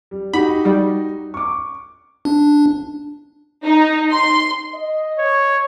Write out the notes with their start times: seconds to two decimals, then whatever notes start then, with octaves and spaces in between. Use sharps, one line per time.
0.11 G3
0.33 D#4 F#4 G4 B5
0.65 G3
1.34 C#6 D6
2.25 D4
3.64 D#4
4.11 C6
4.74 D#5
5.18 C#5